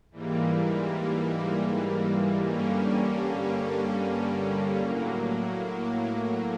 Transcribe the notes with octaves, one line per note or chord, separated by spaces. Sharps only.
G#2 E3 G3 A#3
G2 D3 G3 A#3 C#4
A2 F#3 A#3